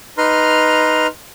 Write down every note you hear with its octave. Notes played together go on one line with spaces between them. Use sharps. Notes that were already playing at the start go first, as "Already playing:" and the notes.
D#4 B4 A#5 C6 F6